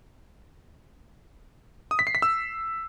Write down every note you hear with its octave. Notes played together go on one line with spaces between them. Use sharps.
D#6
B6
C7
B6
E6